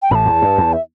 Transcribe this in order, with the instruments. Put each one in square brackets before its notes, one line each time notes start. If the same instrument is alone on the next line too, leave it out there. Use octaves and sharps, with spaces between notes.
[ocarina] G5
[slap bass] A1 A2 [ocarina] A5 B5
[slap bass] E2
G2
E2
[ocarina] E5